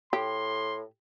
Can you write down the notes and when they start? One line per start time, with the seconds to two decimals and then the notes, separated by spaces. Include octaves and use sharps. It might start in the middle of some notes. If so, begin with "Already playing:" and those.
0.13 A2 G4 C6